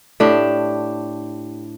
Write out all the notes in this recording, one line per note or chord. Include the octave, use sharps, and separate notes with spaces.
A2 D4 G4